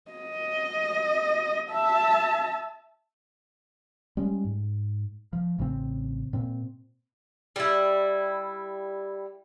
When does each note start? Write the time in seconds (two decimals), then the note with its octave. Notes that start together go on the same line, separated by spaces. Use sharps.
0.11 D#5
1.71 E5 A5
4.17 G3 G#3 C#4
4.45 G#2
5.33 F3
5.58 A1 C#3 E3 C4
6.33 A#2 C4
7.56 G3 E4